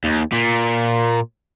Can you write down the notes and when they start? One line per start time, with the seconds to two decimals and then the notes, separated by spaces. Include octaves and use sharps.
0.04 D#2
0.32 A#2